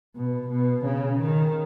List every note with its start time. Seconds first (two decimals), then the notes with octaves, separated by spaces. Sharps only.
0.16 B2
0.50 B2
0.85 C#3
1.20 D#3